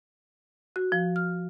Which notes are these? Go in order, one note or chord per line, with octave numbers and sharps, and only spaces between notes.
F#4
F3
F6